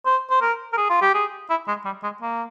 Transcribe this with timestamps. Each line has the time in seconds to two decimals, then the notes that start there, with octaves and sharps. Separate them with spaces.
0.06 C5
0.30 C5
0.42 A#4
0.73 A#4
0.77 G#4
0.90 F4
1.02 G4
1.14 G#4
1.50 E4
1.68 G#3
1.85 G3
2.03 G#3
2.22 A#3